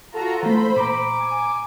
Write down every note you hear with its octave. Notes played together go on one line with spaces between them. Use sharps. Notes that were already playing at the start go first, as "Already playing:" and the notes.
F4 F#4 A4 A#5
E3 A3 C5 B5
A#2 A#5 D6
G#5